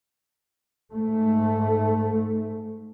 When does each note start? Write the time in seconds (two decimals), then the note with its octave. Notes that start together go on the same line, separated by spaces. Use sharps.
0.91 G#2 A3